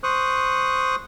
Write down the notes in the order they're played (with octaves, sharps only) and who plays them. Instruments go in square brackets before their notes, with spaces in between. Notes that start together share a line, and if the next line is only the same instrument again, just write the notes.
[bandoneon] C5 C#6 D#6 F#6